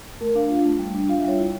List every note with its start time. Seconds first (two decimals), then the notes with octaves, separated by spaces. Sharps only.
0.21 A3 A#4
0.35 D4 F5
0.50 F4
0.65 A3
0.79 G3
0.94 D4
1.09 F4 F5
1.19 E5
1.24 G3 C#5
1.39 E4